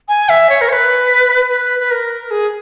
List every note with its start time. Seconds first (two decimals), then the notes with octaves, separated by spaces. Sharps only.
0.09 G#5
0.29 E5
0.50 C#5
0.61 A#4
0.69 C#5
0.72 B4
1.49 B4
1.79 B4
1.91 A#4
2.31 G#4